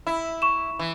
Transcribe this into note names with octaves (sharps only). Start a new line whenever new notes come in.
E4
C#6 E7
E3